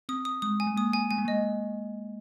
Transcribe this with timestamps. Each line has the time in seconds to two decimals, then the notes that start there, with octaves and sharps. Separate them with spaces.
0.09 C4 D#6
0.25 D#6
0.42 G#3 D#6
0.60 G#5
0.67 G#3
0.77 A#3 D#6
0.93 G#5
1.11 G#3 G#5
1.18 A#3
1.25 G#3 D#5